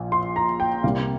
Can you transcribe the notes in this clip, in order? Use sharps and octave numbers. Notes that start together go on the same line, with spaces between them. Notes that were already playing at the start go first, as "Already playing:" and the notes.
Already playing: A#1 A#2 F3
C6
A#5
G5
C2 C3 G3 A#3 F5